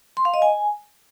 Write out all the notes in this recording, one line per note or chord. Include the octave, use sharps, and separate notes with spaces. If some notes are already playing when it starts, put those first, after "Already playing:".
C6
F5
D#5
G#5